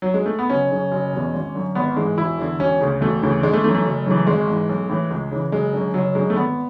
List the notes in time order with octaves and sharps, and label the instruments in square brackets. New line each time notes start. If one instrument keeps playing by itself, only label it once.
[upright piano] F#3
G#3
A3
B3
F#1 C#4
F#2 C#3
F#1
E2 B2
G#1
F#2 D3
G#1 B3
G#2 E3 G#3
E1 E4
E2 D3
E1 C#4
D2 C#3
E1 A3
D2 C#3 E3
G#1 G#3
A3
F#2 E3 A3
A3
F#1
F#2 C#3 E3
G#1 G#3
G#2 E3
B1
A2 E3
C#2
C#3 E3
F#1 G#3
F#2 D3
F#1 F#3
F#2 D3 G#3
A3
G#1 B3